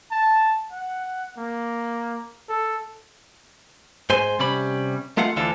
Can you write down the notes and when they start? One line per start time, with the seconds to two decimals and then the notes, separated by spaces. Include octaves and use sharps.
0.11 A5
0.72 F#5
1.38 A#3
2.49 A4
4.10 G#2 C5 G#5 C6
4.39 C3 G3 C#4 B5
5.17 G#3 A3 F4 F5 F#5
5.36 D2 D3 E3 D4 F4 A4